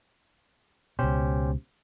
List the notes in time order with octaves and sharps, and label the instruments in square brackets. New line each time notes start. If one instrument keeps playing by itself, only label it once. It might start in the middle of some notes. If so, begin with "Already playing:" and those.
[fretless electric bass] C#2 B2 [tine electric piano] C#4 G4 C5